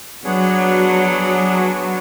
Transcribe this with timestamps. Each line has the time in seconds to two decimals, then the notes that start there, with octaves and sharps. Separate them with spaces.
0.24 F#3 B3 D4 G#4 C#5 F#5
1.61 B3 D4 F#4 C#5